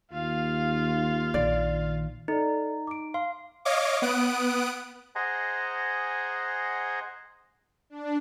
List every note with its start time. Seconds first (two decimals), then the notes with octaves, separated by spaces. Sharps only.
0.12 D#2 F4 F5
1.34 A#1 D#3 D5
2.28 D#4 A4 D5
2.87 D6 D7
3.14 F5 C6
3.65 C#5 D#5 F5 D6
4.02 B3 D#6 F#6 D7
5.15 G#4 C5 D#5 F#5 G#5 A#5
7.90 D4